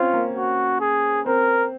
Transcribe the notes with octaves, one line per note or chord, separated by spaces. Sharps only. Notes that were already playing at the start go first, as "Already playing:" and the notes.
Already playing: C4 C#4 F4
A#3
F#4
G#4
C4 A#4